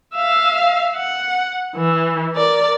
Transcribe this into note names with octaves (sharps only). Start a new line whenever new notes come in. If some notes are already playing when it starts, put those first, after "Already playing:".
E5 F5
F#5
E3
A#4 D5